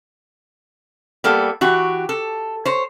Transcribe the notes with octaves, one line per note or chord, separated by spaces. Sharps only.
G3 A#3 B3 A4
E3 F#4 G4
A4
C5 C#5